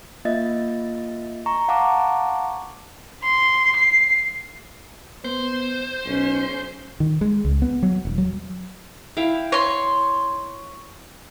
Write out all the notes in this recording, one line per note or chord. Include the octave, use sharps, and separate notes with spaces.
A#3 F4 D#5 E5 A6
A#5 C#6
F5 F#5 A5 A#5 C#6 D6
C6
C7
B3 C5
B1 C#4
D#3
G#3
C#2
B3
F#3
E1
F#3
E4 F5 G5
C#5 C6